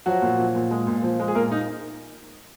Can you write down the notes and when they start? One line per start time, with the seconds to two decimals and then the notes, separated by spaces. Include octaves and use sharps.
0.06 F3 F#3 F#4
0.22 A#2
0.38 F3
0.55 A#2
0.71 G#3
0.87 A#2
1.02 F3
1.20 G#3
1.28 G#4
1.35 A#2 A#3 A#4
1.52 D#4